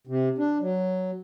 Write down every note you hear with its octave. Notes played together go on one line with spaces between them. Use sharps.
C3
D4
F#3